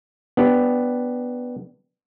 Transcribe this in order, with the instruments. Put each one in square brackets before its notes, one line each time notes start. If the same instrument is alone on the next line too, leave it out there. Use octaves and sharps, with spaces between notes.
[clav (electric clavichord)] B3 D4 G4